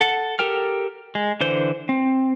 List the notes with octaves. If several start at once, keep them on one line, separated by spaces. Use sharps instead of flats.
A4 F#5
G4 A4 A#4 G5 F6
G#3
D3 E3 C5 G6
C4